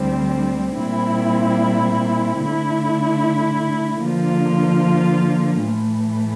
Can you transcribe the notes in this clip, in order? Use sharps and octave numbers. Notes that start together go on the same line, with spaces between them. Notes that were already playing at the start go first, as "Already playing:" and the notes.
Already playing: D2 D3 G3 C4
A#2 G3 C4 E4
D3 A3 E4
D3 F3 A#3 F4
A2 E3 A3